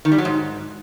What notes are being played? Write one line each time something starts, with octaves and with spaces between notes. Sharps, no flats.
D#3
G3
F#3
G#2